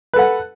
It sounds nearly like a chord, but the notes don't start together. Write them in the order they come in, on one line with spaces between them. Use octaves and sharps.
B4 A4 F#5